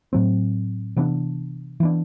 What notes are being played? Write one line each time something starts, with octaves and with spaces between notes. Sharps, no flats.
A2 F#3 C4
C3 E3 B3 D4
E3 B3 D4